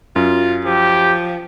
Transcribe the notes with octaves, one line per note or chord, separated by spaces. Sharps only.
F#2 F4
F3 G4